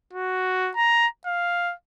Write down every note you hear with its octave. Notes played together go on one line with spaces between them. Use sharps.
F#4
A#5
F5